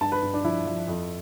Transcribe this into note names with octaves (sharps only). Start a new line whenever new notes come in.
G2 A5
B4
G2
D4
F3 E4
F3
F2